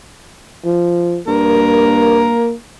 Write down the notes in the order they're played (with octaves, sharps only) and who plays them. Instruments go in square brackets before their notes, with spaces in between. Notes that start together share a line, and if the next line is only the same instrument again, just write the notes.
[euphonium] F3
[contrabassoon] G2 [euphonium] A#3 [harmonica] A#4